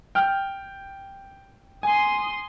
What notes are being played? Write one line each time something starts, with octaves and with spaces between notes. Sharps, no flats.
G5 F6
G#5 C6 D#6